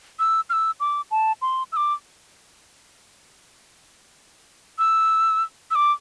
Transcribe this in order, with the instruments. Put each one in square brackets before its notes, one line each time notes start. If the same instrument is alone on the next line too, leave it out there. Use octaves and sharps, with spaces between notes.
[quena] E6
F6
E6
D6
A5
C6
E6
D6
E6
E6
D6